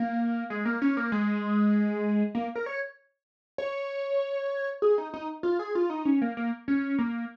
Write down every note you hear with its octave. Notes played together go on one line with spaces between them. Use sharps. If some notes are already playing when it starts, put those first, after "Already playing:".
Already playing: A#3
G#3
A#3
C#4
A#3
G#3
A#3
A#4
C#5
C#5
G#4
D#4
D#4
F4
G#4
F4
D#4
C#4
A#3
A#3
C#4
A#3